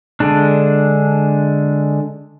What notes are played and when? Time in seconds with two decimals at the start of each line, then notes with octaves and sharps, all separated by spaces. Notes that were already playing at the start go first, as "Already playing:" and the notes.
0.20 D3 G#3 D4